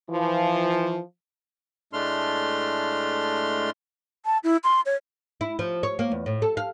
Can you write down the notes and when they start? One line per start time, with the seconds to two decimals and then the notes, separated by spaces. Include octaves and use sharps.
0.10 E3 F3
1.93 A2 G#3 A3 D4 C6 F6
4.25 A5
4.44 E4
4.64 C6
4.86 C#5
5.41 E4
5.59 F3
5.83 C#5
5.99 A#3
6.12 E2
6.26 A2
6.42 A4
6.57 F5